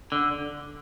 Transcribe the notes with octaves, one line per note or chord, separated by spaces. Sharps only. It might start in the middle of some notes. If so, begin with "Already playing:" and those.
D3